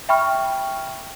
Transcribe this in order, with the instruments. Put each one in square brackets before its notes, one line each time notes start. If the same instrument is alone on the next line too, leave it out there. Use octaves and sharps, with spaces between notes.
[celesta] E5 G5 B5 C#6 F6